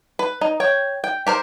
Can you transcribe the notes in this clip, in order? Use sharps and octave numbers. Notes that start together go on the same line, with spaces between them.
B4
D#4
C#5 G5
G5
G4 A#4 C5